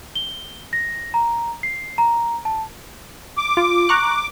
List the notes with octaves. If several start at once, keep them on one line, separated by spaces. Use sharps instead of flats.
G7
A#6
A#5
C7
A#5
A5
D6
F4
A#5 C#6 F#6